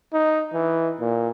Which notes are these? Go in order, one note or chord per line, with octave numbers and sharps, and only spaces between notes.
D#4
E3
A#2